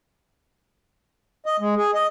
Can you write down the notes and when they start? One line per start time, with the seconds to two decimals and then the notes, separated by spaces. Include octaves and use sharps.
1.46 D#5
1.60 G#3
1.77 G#4
1.94 D#5